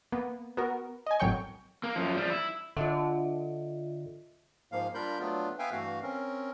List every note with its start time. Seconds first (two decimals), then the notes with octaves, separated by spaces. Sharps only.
0.12 A#3 B3
0.57 B3 F#4 A#4
1.07 D#5 G#5
1.20 G#1 A2 F#3 C#5 G5 C#6
1.84 A#3
1.96 F#2 F3
2.16 F3 G3
2.30 E4
2.77 D3 F4 D#5 E5
4.72 G#2 F3 A#3 F5
4.94 G3 D4 F4 A#4 B5 G6
5.19 F#3 A3 B3 D4 F4
5.59 B3 B4 E5 F5 G5 G#5
5.72 G2 E3 A3 F#4 F5
6.03 C4 C#4 A#4